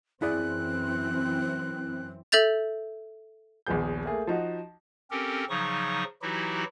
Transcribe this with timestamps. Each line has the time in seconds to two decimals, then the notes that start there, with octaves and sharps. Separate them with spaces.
0.22 F#2 E3 C4 E4 G#4 D5 F#6
2.32 A4 E5 G6 A6 F7
3.67 A#1 D#2 F3 B3 G#4 G6
4.06 A3 A#3 G#4
4.27 F3 D#4 F#4
5.11 C4 C#4 G4 A4 A#4
5.50 C#3 F3 F#3 D#4 C#6 D#6
6.22 E3 F#3 D#4 E4 F#4 G4